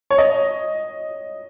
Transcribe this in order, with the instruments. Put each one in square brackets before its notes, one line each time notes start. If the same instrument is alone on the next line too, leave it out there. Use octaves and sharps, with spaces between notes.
[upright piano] C#5
D#5